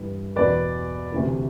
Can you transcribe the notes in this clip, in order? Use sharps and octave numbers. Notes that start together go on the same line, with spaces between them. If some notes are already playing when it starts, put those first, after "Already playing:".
Already playing: G2 E3
E2 B2 B4 D5
D2 C3 E3